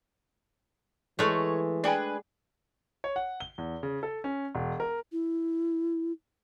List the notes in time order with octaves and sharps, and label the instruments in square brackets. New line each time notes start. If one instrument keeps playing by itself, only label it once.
[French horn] E3 [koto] G#3 A3 [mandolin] C#5
[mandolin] D4 G#4 B4 [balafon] D5 G5 G#5
[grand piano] C#5
F#5
G7
E2
C#3
A4
C#4
E1
A#4
[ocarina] E4